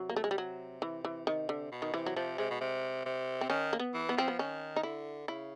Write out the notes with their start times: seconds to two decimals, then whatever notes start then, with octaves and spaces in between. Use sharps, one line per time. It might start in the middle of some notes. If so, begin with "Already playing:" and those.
Already playing: C3 F#3
0.09 A#3
0.16 A3
0.24 G#3
0.31 G3
0.38 F#3
0.82 E3
1.05 E3
1.27 D#3
1.49 D3
1.71 B2
1.82 D#3
1.94 C3 E3
2.06 F#3
2.16 C3 F3
2.38 C3 G#3
2.50 B2
2.61 C3
3.06 C3
3.41 C4
3.50 D#3 C#4
3.73 A#3
3.79 B3
3.94 E3
4.09 B3
4.17 F3 C4
4.28 B3
4.39 D#3 C#4
4.76 D#4
4.83 D3 E4
5.28 C#3 E4